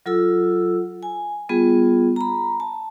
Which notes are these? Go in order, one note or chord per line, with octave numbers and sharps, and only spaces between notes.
F#3 F4 A4 E6
G#5
G3 B3 F4 G#4
A#5 B5
A5